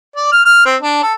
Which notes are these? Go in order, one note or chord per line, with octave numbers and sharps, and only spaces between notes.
D5
F6
F6
C4
D4
A4